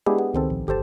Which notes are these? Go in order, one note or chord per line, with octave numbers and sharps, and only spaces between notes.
G#3 B3 D4 E4 G4 G#4
B3
C#2 D#3 C4 A4
A#1
G1 G4 A4 C5 A5